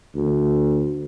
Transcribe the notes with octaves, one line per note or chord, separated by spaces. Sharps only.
D2